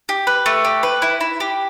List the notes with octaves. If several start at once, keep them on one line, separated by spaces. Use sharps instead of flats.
G4
B4
A3
G4
B4
E4
E4
G4